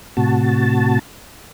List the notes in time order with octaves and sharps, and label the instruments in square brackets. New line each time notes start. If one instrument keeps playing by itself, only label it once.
[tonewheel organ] A2 C3 F#4 A5